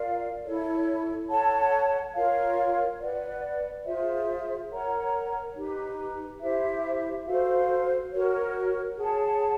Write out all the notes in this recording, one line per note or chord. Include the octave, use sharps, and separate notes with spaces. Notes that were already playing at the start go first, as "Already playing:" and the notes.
Already playing: F4 A#4 D5 F5
E4 A4 C#5
A4 C#5 F#5 A5
F4 A#4 C#5 F5
B4 D5 F#5
F4 G#4 C5 E5
A#4 C#5 F#5 A#5
D#4 G4 B4
E4 G4 C5 E5
F#4 A4 C5 F5
F#4 A#4 C#5
G#4 C#5 F#5 A5